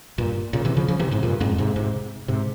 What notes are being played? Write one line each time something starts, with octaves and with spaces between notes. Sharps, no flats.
G2 A#2
A#2 C#3
C3 E3
C#3 F3
C#3 F3
C3 E3
G#2 C3
G2 A#2
F2 G#2
G#2 C3
G#2 C3
G#2 C3